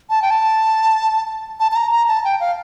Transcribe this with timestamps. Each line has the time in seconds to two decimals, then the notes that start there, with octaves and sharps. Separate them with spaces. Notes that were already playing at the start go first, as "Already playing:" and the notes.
0.10 A5
0.22 G5
0.31 A5
1.60 A5
1.72 A5
1.76 A#5
1.92 A#5
2.09 A5
2.24 G5
2.40 F5